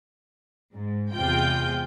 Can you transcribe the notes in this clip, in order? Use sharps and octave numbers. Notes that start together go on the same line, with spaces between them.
G#2
E2 C3 G#3 F4 G5 G6